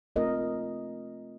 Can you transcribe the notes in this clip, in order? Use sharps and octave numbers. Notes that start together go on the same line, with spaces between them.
A3 C4 F4 A#4 D#5